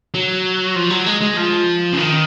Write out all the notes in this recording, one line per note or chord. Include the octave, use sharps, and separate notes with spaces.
F#3
F3
F#3
G#3
G#3
F3
C#3
D#3